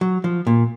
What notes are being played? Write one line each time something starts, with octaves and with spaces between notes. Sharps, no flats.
F#3
F3
A#2